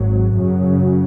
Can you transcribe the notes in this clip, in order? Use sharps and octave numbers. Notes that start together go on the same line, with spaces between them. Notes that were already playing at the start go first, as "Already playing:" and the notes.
Already playing: G#1 G#2 F#3
F#2 C#3 F#3